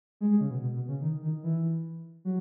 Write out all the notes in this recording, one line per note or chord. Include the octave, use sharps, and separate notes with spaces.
G#3
G#3
C#3
B2
B2
B2
C#3
D#3
D#3
E3
F#3